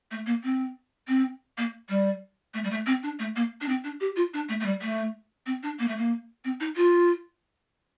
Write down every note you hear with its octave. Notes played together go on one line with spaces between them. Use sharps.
A3
A#3
C4
C4
A#3
G3
A3
G3
A3
C4
D4
A3
A#3
D4
C4
D4
G4
F4
D4
A3
A3
G3
A3
C4
D4
A#3
A3
A#3
C4
D#4
F4